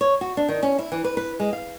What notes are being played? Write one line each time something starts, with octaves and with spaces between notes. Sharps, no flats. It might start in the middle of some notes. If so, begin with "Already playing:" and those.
C#5
F#4
D4
D#3
C#4
E4
E3
B4
B4
G#3
F5